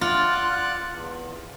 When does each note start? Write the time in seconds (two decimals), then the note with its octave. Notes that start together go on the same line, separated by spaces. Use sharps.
0.01 F4 D5 F#5 F#6
0.93 E2